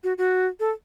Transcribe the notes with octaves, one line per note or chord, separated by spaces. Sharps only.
F#4
F#4
A4